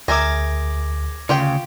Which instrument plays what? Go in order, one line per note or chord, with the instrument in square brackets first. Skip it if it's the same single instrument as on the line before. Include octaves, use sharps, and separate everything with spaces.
[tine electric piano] D2 [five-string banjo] G#4 A#4 E5 [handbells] D6 G#6 A#6
[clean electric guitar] D2 C#3 [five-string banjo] F4 G4 G5